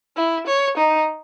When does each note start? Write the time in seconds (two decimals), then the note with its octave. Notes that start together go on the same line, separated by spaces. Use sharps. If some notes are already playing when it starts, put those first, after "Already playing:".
0.16 E4
0.47 C#5
0.77 D#4